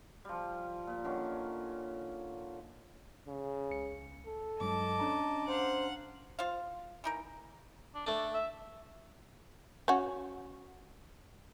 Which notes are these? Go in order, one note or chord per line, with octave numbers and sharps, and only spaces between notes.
F3 G3
A#2
D3 D#3 C#4
C#3
C#2 C#7
A4
G2 F#3 G#3 D#5 A5 D6
C#4 D4 A#5
C5 F5 F#5
F4 C5 F5
E3 D#4 A#4
D4
A3 D4 A4
E5
C#4 F#4